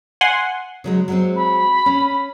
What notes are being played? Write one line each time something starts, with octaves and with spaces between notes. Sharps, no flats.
F#5 G#5 C6
C#3 F#3 G#3
F#3 G#3 C4
B5
C#4